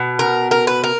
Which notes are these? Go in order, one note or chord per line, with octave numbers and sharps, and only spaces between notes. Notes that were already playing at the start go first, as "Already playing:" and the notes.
Already playing: B2
A#4
A#4
B4
A#4